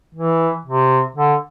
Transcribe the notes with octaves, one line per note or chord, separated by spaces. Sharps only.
E3
C3
D3